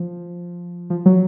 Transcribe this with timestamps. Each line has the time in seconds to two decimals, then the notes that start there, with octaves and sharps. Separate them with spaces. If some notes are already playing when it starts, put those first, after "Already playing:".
Already playing: F3
0.90 F3
1.06 F#3